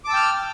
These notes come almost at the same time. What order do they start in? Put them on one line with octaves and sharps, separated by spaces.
D6 A5 E6 G5 F6